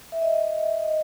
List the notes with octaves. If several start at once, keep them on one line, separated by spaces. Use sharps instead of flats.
E5
D#5
D#5